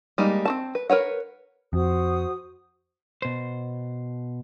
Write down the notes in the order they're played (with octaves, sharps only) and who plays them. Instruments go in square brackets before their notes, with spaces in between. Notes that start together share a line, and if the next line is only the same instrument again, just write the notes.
[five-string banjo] G3 G#3 A#3 D#4
C4 F#4 A5
B4
A#4 B4 C#5 F#5
[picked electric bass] F2 [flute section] F#4 C5 D#6
[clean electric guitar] B2 C5